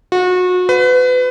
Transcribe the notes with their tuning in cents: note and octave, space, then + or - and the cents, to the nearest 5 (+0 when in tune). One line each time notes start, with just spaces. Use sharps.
F#4 -30
B4 +30